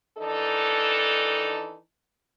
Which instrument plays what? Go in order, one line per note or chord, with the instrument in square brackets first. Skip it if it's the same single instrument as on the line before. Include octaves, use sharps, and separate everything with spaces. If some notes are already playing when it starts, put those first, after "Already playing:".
[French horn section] D#3 E3 D4 D#4 A4